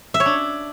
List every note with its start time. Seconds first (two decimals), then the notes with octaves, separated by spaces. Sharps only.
0.14 E5
0.20 C#5
0.26 D4